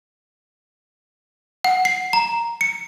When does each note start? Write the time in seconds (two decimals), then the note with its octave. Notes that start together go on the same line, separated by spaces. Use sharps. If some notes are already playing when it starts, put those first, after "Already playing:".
1.65 F#5
1.85 C7
2.13 A#5
2.61 C#7